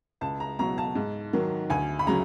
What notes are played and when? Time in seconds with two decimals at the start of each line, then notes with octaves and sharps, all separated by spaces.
0.21 C#2 A5
0.40 A#5
0.59 B2 F#3 A#5
0.78 A5
0.95 G#2
1.33 D#3 F#3
1.70 D2 G#5
1.99 B5
2.07 C#3 F#3 A#5